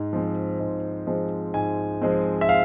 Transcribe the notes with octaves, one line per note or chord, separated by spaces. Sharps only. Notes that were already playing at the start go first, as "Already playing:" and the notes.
Already playing: G#2
F3 G#3 C4
G#2
F3 G#3 C4
G#2 G#5
F3 G#3 C4
E5
F5